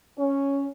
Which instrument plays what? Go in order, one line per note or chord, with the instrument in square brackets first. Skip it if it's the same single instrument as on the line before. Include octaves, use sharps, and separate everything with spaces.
[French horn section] C#4